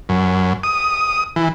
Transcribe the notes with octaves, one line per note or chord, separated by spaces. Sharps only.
F#2
D#6
E3